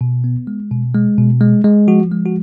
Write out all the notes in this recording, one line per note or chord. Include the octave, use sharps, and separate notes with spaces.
B2
B3
G#3
B2
G#3
B2
G#3
G#3
F3 F#4
G#3
F#4